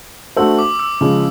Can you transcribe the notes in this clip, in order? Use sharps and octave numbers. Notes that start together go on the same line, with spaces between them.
A3 D4 F#4 A4 C5 E6
D6
E6
C#3 F3 G#3